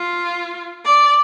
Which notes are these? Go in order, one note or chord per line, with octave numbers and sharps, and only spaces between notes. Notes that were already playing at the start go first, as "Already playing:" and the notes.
Already playing: F4
D5